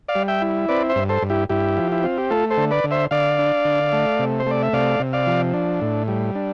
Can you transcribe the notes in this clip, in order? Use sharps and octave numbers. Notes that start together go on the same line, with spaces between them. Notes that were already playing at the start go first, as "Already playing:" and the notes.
D5 F5
G3
E5 G5
E4
C4 B4 D5
C5 E5
G2
A4 C5
G2
E4 G4
G2 E4 G4
F3
E4
C4 F4
G4
A3 F4 A4
A4 C5
D3
B4 D5
D3
C5 E5
D3 D5 F5
D4
D3
A3
C3
C5
A3 D5
E5
C3 D5 F5
C3
D5 F5
F3
D4
A2
G3
D4